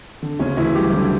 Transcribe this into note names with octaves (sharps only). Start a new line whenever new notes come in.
D3
D2 C#3 C#4
D2 E3 E4
F#3 G3 G4
D3 E3 E4